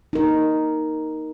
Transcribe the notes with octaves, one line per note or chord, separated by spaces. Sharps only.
D#4 A#4